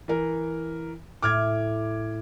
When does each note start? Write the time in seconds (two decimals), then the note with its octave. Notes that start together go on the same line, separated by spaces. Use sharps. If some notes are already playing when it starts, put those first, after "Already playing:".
0.08 E3 A#4
1.22 A2 D6 F6 G#6